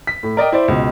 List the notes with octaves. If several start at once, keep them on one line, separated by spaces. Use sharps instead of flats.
B6
A2
A#4 D5 D#5 G5
E4 C5 D5
C#2 B2